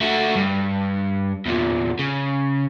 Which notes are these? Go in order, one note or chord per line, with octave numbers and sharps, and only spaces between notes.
A3 F#4
G2
E2 A#2
C#3